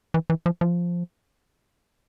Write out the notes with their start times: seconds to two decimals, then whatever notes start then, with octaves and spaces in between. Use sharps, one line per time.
0.14 E3
0.30 E3
0.46 F3
0.61 F3